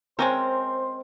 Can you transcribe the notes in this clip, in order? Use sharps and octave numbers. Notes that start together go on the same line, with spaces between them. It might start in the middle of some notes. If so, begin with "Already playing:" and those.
G#3 C4 C#4 A#4 C5